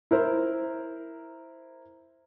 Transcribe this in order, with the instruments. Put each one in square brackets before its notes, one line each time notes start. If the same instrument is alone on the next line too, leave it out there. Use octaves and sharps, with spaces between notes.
[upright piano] E4 A#4 C5